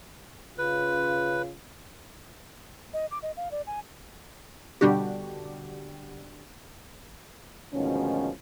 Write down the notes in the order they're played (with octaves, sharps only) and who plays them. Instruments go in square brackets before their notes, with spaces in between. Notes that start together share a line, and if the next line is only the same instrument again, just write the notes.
[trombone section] C#3 F4 [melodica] B4
[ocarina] D#5
D6
D#5
F5
D5
G#5
[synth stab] B2 D3 G3 D4 F#4 G4
[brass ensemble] D2 G#2 B2 D#3 F3 C#4